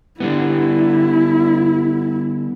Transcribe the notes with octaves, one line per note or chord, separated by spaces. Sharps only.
D3 G3 B3 E4